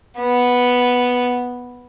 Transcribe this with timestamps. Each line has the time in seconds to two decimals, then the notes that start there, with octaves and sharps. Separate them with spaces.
0.19 B3